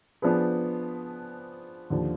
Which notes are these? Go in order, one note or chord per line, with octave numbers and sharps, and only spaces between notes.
F3 B3 D4 G#4 B4
D#2 D3 F3